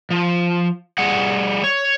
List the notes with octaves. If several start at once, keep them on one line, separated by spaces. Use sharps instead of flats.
F3
G3 G#4 F#5
C#5